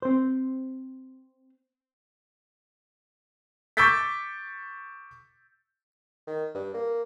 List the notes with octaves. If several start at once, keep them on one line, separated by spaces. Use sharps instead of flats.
C4 C5
C#6 D6 E6 G6 A6 B6
D#3
G2
A#3